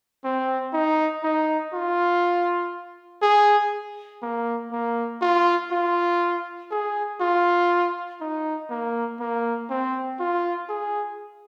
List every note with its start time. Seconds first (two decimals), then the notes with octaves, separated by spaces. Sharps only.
0.24 C4
0.73 D#4
1.24 D#4
1.73 F4
3.22 G#4
4.22 A#3
4.71 A#3
5.21 F4
5.71 F4
6.71 G#4
7.21 F4
8.21 D#4
8.70 A#3
9.20 A#3
9.70 C4
10.20 F4
10.69 G#4